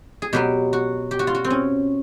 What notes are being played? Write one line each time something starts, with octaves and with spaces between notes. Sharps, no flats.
G#4
B2 F#3 B3 G4
F#4
G4
F#4
F4
F#4
C4
C#4